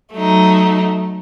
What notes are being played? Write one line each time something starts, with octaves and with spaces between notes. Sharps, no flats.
F#3 A3 D#4